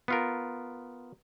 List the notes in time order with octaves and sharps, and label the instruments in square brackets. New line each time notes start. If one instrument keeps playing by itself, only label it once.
[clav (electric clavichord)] B3 F4 A#4